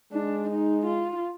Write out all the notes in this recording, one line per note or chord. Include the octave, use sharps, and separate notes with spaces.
G#3 D4
D#4
F4